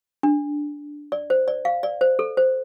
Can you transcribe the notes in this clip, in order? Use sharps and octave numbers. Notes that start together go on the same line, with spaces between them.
D4
D5
C5
D5
F5
D5
C5
A4
C5